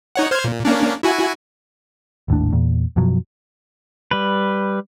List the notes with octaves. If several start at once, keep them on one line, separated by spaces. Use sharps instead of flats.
D#4 C#5 F#5
C5 F6 G#6
A#2
A#3 C#4 D4
E4 F#4 G#5
G#1 D#2 A2 D4
E2 A#2
F#2 B2 F3 F#3
G3 B4